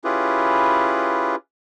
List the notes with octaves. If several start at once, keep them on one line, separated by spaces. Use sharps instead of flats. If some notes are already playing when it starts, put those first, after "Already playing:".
C#4 E4 F4 G4 G#4 B4